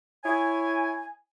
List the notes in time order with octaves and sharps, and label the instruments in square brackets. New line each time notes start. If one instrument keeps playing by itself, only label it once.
[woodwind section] E4 C#5 G#5